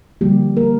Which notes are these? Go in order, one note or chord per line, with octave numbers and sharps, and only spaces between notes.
D3 F3 G3 A#3 G4
A#3 A#4